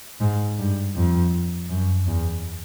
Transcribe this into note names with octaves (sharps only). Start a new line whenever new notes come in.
G#2
G2
F2
F#2
E2